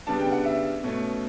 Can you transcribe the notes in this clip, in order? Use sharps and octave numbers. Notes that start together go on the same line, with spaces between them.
C#3 G3 B3 D4 A5
G5
F#5
E5
B2 A3 C#4